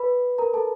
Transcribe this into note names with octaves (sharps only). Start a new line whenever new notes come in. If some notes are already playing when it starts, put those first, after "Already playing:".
Already playing: B4 B5
A#4 A#5
A4 A5